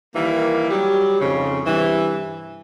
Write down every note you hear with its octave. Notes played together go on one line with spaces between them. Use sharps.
D#3 E3 G3 A#3
F#3 G3
F2 G#2 C#3
G2 C3 E3